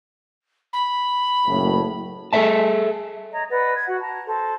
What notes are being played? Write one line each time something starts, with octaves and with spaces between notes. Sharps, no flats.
B5
F#1 A2
G#4 A4 B4 C5 E5 A5
C#5 D#5 A#5
B4 D5 D#5 F#5
G#6
F#4 F#5
A5 A#5
A4 C5